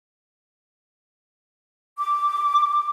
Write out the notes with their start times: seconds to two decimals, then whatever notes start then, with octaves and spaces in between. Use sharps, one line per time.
1.98 D6